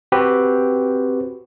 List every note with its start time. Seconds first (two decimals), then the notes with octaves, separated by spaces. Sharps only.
0.12 C4 F#4 G4 B4